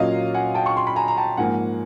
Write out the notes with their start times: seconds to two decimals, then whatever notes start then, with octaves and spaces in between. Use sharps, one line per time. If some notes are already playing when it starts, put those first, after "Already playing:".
Already playing: A#2 F#3 A#3 C#4 F4 C#5 D#5 F5
0.34 F#5 G#5
0.54 G5 A5
0.66 C#6
0.77 C6
0.87 B5
0.96 G#5 A#5
1.08 A#5
1.17 G5 A5
1.37 G#2 F3 A#3 F#5 G#5